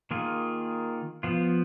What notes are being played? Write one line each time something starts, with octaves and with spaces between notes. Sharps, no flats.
D#3 A#3 F4 G#4
F3 B3 F4